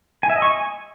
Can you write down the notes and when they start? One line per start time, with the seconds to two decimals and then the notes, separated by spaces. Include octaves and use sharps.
0.23 G#5
0.30 E5
0.36 D#5
0.42 C#6
0.49 G#5